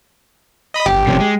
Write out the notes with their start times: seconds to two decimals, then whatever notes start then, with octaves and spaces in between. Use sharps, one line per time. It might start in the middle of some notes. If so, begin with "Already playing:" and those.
0.74 D#5 B5 D#6
0.86 G1 G4
1.07 C3 F3 C#4
1.20 G#3